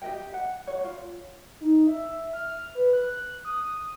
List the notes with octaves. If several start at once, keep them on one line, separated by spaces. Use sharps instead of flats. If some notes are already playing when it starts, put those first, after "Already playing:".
G4 D#5 G5
F#5
C#5 F#5
F4
D#4
E5
F6
B4
F#6
D#6